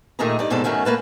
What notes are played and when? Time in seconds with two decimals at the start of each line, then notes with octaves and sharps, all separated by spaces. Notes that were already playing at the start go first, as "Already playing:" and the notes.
0.19 A#2 D#3 A3 G#4 D#5 A#5
0.39 G2 D#4 D5
0.50 G#2 B2 C4 D#4 A4 D5
0.64 F#2 D#3 F#3 A3 C#4
0.85 A3 A#3 B4 A5